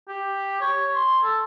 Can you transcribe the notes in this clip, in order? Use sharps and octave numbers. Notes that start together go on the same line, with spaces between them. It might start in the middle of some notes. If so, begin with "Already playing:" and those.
G4
C#5
C6
A4